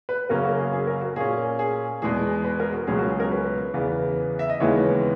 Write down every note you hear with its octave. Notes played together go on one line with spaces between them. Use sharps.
B4
F#2 C#3 F#3 A#3 C#4 A#4
F#4
G#4
G#4
A#4
F#4
A#2 A#3 C#4 G#4
G#4
E2 B2 G#3 G#4
B4
A#4
F#4
C#2 B2 F#3 C#4 G#4
F#4
G#4
A#4
B4
E2 C#3 E3 B3
E5
D#5
D#2 C#3 E3 G#3 B3 C#5